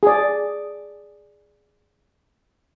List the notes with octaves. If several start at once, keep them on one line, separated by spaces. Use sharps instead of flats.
G#4 D5